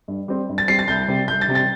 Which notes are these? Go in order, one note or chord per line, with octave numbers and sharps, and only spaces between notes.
G2
G3 C4
G2
A6
G3 C4 C7
A6
C2 G6
C3 G3 C4
C2 G6
A6
C3 G3 C4
A6